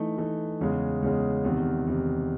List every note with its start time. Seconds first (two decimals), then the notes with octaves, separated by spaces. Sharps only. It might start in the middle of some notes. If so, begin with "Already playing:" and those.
Already playing: E3 A3 D#4
0.18 E3 A3 D#4
0.61 E2 C#3 G#3
1.02 E2 C#3 G#3
1.44 E2 C3 D#3
1.87 E2 C3 D#3